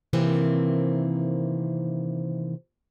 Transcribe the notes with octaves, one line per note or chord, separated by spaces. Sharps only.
C3 D#3 E3 A#3 C4